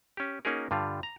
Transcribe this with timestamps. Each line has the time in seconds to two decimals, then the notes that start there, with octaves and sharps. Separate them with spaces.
0.17 C#4 G4
0.45 A#3 C#4 D#4 F#4 G#4 A#4
0.71 G2 D3 G3 F4
1.03 A#5